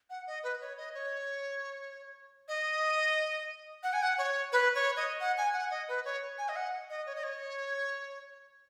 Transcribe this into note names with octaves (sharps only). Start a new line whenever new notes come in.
F#5
D#5
B4
C#5
D#5
C#5
D#5
F#5
G#5
F#5
C#5
B4
C#5
D#5
F#5
G#5
F#5
D#5
B4
C#5
G#5
D#5
F#5
D#5
C#5
D#5
C#5